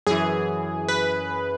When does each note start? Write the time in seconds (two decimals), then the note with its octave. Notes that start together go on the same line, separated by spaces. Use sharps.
0.07 F#2 E3 G#4
0.88 B4